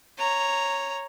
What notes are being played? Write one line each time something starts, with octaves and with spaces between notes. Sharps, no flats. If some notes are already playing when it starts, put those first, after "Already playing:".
C#5 A#5